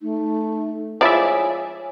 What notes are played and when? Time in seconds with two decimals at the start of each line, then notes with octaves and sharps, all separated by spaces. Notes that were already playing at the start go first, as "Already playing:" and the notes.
0.02 A3 D#4
1.01 F3 G#3 E4 C#5 D5 E5 G#5